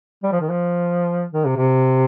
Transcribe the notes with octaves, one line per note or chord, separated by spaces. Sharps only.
G3
F3
D#3
F3
D#3
C3
C3